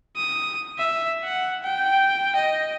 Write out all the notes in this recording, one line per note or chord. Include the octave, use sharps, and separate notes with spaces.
D#6
E5
F#5
G5
D#5